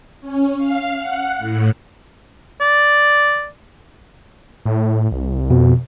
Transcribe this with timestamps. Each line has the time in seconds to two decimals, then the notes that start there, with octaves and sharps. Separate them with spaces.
0.20 C#4
0.57 F5
0.97 F#5
1.37 A2
2.61 D5
4.65 A2
5.12 C2
5.50 F2 B2